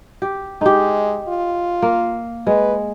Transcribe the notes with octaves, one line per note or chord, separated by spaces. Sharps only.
G4
G#3 D#4 G4
F4
A#3
G#3 B4